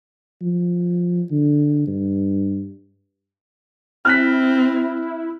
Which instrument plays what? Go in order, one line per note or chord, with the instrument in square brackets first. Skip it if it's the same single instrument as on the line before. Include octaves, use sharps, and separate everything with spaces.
[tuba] F3
D3
G2
[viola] C4 [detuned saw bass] E4 [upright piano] F6 F#6 B6